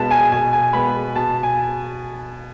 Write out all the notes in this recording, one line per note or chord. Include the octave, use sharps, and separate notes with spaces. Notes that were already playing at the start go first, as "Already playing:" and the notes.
Already playing: B2 G#3 B3 A5
G#5
B2 G#5
G#5
G#3 B3 B5
B2 A5
G#5